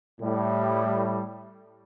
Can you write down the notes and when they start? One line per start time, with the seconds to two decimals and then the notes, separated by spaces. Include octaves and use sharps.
0.20 A2 G3